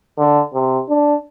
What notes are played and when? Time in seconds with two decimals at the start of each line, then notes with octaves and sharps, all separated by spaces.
0.18 D3
0.54 C3
0.89 D4